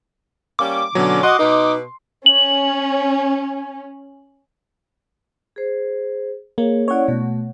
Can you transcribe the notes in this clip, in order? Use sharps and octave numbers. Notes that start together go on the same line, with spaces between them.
G3 A#3 C#4 D6
B2 D3 F#3 C#4
F#4 D#5 C6
B2 D#4 B4
C#4 F#7
G#4 C5
A#3 G#4 C#5
C#4 E4 C#5 D5 F#5
B2 A3